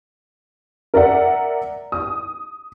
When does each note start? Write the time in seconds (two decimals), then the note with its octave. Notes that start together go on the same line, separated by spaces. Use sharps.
0.94 A#4 D5 E5 F#5
1.92 D#6